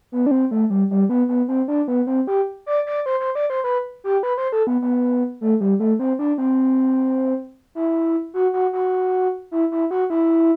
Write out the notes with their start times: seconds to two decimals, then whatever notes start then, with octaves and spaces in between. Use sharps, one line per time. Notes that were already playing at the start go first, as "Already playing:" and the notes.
0.12 B3
0.26 D4
0.31 C4
0.51 A3
0.70 G3
0.91 G3
1.09 B3
1.29 B3
1.48 C4
1.68 D4
1.88 B3
2.07 C4
2.27 G4
2.66 D5
2.86 D5
3.06 C5
3.20 C5
3.35 D5
3.50 C5
3.64 B4
4.04 G4
4.23 B4
4.38 C5
4.52 A4
4.67 B3
4.82 B3
5.41 A3
5.61 G3
5.80 A3
5.99 C4
6.19 D4
6.38 C4
7.75 E4
8.34 F#4
8.53 F#4
8.73 F#4
9.51 E4
9.72 E4
9.91 F#4
10.10 E4